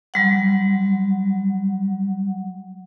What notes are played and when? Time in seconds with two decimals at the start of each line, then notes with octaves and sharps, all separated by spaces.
0.14 F#3 G3 F#5